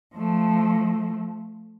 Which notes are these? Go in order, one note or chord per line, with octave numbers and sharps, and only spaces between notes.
F3 A3